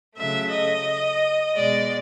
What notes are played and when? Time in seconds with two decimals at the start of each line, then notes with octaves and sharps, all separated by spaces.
0.15 C#3 F#3 A3 E5
0.50 D#5
1.54 B2 G#3 D5